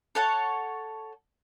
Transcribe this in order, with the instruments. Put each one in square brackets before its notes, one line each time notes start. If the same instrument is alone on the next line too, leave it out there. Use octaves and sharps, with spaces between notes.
[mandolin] A4 C#5 F#5 A5